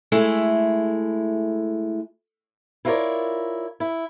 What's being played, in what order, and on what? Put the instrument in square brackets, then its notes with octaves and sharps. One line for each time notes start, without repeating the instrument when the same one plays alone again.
[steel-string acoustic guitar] G#3 A3 E4
E4 F4 A#4 B4 C#5 D5
E4